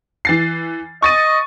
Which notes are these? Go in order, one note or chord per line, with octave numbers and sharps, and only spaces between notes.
E3 A6 C7
D#5 C#6 A6 D#7